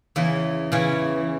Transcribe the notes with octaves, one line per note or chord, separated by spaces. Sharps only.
E2 C#3 E3
C#3 E3 C#4